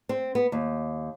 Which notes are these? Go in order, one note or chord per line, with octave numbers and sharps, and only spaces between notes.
C4
B3
D#2